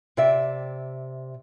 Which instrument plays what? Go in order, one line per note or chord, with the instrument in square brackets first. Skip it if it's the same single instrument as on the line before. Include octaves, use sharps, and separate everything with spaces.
[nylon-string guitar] C3 D5 E5